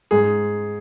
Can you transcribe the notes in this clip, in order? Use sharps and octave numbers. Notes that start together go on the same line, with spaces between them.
G#2 G#4